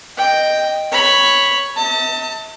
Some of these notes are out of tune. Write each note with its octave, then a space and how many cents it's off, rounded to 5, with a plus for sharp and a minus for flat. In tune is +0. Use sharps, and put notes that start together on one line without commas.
D#5 -5 G5 +0
C#5 +0 B5 +0
E5 -45 A5 +30